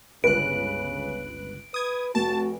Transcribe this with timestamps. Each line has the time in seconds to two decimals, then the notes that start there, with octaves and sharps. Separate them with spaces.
0.24 G1 C#2 C#3 B4 F#6 D7
1.74 B4 D#6 G#6
2.15 F1 F#4 A5 A6